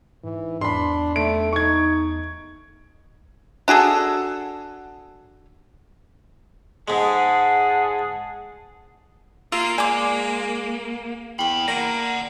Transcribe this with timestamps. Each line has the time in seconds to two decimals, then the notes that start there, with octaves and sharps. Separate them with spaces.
0.24 G#2 E3
0.61 E2 D4 B5 C6
1.16 A3 D7
1.53 D#4 C#6 G#6
3.68 D4 F#4 G#4 A4
6.88 G#2 G#3 G#4 F#5 A5
9.52 A#3 F4 A#4 E6
9.78 G#3 D5 G#5 C6 D6
11.39 E2 G#4 G5 B5 G7
11.68 A#3 D5 F#5 A#6 D7